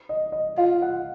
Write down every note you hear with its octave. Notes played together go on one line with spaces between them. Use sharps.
D#5
D#5
F4 F5
F#5